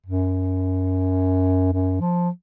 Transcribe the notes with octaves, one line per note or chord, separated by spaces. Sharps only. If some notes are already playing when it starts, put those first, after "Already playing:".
F#2
F#2
F3